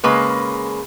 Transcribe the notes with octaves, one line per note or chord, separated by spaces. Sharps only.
C#3 G#3 A#3 B4